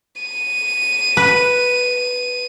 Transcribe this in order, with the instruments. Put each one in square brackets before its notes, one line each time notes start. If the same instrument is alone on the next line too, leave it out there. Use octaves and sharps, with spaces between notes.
[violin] D#7
[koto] B4